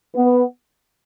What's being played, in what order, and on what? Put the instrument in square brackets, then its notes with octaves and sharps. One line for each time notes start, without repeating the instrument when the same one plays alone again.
[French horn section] B3